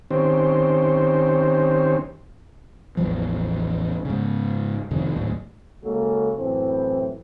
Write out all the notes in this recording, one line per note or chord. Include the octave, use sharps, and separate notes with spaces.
D#3 C4 C#4 G4 C5
A1 E2 E3 F3
G#2 C#3
F2 C3 D#3
D#2 A2
C#3 G#3 A#3 F#4 A4
F#2 A2 E3 C4